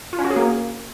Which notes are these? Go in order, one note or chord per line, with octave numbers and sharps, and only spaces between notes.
F4
C#4
F#4
G#4
A#3